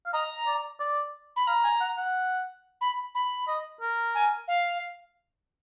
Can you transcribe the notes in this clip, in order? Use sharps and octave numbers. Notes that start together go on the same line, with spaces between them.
F5
D#5 A#5
D5
D5
B5
F5 A#5
G#5
F#5
F#5
B5
B5
D#5
A#4
G#5
F5